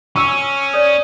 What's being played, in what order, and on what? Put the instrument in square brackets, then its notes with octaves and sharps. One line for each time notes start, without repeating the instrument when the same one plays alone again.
[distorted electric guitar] C#4 [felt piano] C#6 E6
[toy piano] C#5 D5 D#6